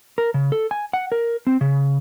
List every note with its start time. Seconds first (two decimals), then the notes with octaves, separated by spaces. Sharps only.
0.18 A#4
0.34 C#3
0.52 A4
0.71 G#5
0.93 F#5
1.12 A#4
1.47 C4
1.61 C#3